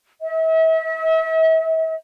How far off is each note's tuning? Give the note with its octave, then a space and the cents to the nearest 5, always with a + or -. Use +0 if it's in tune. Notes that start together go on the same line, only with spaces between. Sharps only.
E5 -40